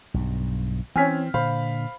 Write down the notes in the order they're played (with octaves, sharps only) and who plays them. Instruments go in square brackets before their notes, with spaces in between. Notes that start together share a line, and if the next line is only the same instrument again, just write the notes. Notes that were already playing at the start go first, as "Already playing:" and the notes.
[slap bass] B1 G2
[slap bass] E3 [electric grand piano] C4 F6 B6 [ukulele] C#4 C#5 G#5
[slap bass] A#2 D3 [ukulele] C5 [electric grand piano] F5 B5